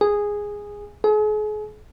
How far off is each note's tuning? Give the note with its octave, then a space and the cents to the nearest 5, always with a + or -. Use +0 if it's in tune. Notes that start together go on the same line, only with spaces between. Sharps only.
G#4 -10
G#4 +40